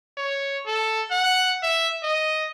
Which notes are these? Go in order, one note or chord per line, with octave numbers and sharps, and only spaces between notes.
C#5
A4
F#5
E5
D#5